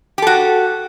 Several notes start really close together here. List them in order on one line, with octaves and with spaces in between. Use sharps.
G4 A4 F#4